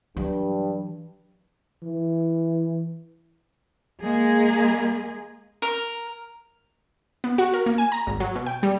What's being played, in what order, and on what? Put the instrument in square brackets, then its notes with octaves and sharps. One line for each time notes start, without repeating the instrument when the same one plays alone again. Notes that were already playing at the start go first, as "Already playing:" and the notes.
[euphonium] G2 [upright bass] E3 F#3
[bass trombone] E3
[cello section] G#3 A#3 G#4
[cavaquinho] A#4
[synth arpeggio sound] B3
F#4
A#4
A#3
G#5
A#5
G#1
F#3
B2
G5
G3